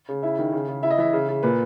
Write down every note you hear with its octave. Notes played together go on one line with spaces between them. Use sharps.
C#3
E4 E5
D#3
C#3
C#3
E4 E5
D#5
E3 E5
C#3
C#3
A#2 B4